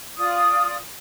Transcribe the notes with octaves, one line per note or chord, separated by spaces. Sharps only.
F4 D5 D#6